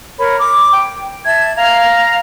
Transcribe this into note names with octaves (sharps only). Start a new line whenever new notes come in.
A#4 C#5 B5
D6
G5
E5 A5 G#6
F5 A#5